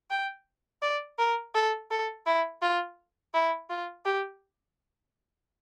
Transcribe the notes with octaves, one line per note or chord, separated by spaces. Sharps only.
G5
D5
A#4
A4
A4
E4
F4
E4
F4
G4